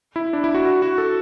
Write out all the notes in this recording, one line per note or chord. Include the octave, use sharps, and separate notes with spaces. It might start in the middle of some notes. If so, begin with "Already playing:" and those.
E4
D4
E4
F#4
F#4
F#4
A4